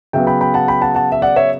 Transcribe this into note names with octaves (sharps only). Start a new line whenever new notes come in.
C#3 F#3 B3 E5 G5
G5 B5
G5 B5
F#5 A5
G5 B5
F#5 A5
F#5 A5
E5
D5 F#5
C#5 E5